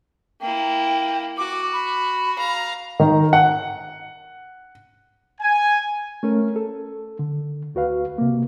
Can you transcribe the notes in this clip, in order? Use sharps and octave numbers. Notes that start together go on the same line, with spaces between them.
A#3 E4 G5
F#4 D6
B5
F5 A#5
D#3
F#5
G#5
A3 C#4 A#4
A4
D3
D2 F#4 B4 F5
C3 A#3